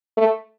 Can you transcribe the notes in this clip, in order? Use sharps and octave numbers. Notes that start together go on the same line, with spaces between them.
A3